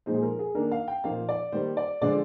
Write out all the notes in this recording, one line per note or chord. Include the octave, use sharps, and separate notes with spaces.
A#2 F3 G#3 D#4 C5
G#4
A#4
G#4
D#3 A#3 D4 A#4
F5
G5
A#2 F3 A#3 D#4 F5
D5
D#3 G3 A#3 C5
D5
D3 F3 G#3 D5